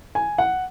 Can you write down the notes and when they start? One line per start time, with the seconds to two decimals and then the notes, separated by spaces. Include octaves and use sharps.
0.15 G#5
0.38 F#5